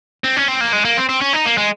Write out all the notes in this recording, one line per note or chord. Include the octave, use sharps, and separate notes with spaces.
C4
C#4
C4
A#3
G#3
A#3
C4
C4
C#4
D#4
A#3
G#3